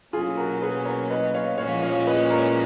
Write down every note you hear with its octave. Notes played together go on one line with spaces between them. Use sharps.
B2 F#3 A#3 C#4 F4 G#4
F#4 A#4
G#4 B4
A#4 C#5
B4 D#5
C#5 F5
A#2 F3 G#3 C#4 F#4 C#5 F5
C#5 F5
B4 D#5
A#4 C#5